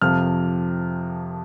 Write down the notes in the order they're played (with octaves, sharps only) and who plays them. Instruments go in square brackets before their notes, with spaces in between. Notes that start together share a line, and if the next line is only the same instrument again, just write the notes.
[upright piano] F2 C3 F3 F6